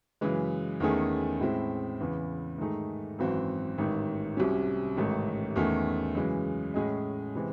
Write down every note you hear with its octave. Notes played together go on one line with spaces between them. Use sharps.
F#2 C#3 E3 G#3
E2 D#3 A3 C#4 G#4
A2 G#3 C4 E4
E2 C#3 E3
G#2 D#3 A3 D#4 G#4
G#1 F#2 E3 C4 F#4
A1 G#2 D#3
C2 C3 F#3 C#4
A1 G#2 D#3 A3
E2 D#3 A3 C#4
F#2 C#3 E3 G#3
A2 G#3 C#4 G#4 D#5
C3 E3 G#3 C4